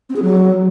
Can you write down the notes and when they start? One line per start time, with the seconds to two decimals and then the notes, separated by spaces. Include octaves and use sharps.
0.09 C4
0.16 G#4
0.22 F#3